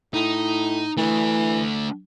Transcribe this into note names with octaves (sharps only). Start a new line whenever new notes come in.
A2 D#4
E3 A3 D4